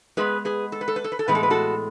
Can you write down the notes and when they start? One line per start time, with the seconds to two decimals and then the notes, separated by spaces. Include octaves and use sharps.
0.17 A2 G#3 B3 G#4 B4
0.45 G#4 B4
0.72 A4
0.81 B4
0.88 A4
0.96 B4
1.04 A4
1.12 B4
1.19 A4
1.28 A2 E3 G#3 B3 B4
1.35 A4
1.43 B4
1.50 F#4 A4